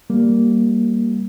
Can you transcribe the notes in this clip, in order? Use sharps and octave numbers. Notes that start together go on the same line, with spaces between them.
G3 A#3